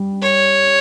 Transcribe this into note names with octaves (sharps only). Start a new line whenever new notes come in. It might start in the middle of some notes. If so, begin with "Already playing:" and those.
Already playing: G3
C#5